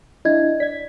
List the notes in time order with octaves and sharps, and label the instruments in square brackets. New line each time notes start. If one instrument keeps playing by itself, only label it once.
[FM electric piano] D4 E4 [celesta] D#5 G#6
[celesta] D5 [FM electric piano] G#6 B6